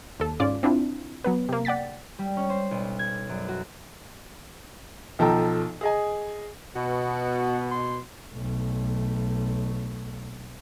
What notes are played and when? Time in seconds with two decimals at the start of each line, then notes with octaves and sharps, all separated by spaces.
0.19 D#2 A4
0.40 G#2 C#4 F4 D5 D6
0.63 C4 D4 E4 F4
1.24 F#3 B3 B4
1.49 C3 A#3
1.65 D5 F#5 G5 A6 B6
2.19 G3
2.37 C#4
2.50 C5
2.71 B1
2.99 G#6
3.29 F#2
3.49 F#4
5.19 B1 F3 A4 G5 A5 A#5
5.81 G#4 D#5 G#5
6.76 B2 F#4
7.72 C6
8.31 B1 A3